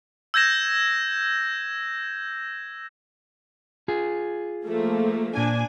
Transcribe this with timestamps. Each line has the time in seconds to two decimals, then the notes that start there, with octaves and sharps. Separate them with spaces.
0.34 E6 G6 G#6 A#6 E7
3.88 F4 G#4
4.65 F3 A3 A#3
5.37 A#2 D4 G#5